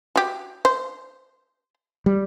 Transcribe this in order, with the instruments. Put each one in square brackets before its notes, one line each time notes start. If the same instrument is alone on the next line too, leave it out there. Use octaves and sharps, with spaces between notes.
[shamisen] F#4 G4
C5
[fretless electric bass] G3